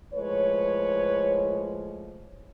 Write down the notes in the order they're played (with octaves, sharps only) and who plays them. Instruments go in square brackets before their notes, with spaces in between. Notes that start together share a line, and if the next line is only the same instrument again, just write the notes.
[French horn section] A2 F3 G#3 B4 C#5